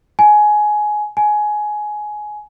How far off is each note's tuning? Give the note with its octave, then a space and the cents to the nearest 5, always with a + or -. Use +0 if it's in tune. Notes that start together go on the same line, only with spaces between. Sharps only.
G#5 +15
G#5 +15